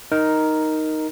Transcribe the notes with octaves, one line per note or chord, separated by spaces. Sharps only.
D#4 A#4